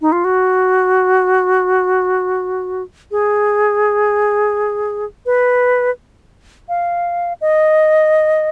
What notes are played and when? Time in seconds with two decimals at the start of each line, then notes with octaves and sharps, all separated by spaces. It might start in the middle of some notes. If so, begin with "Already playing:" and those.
0.01 D#4
0.12 F4
0.25 F#4
3.11 G#4
5.26 B4
6.69 F5
7.41 D#5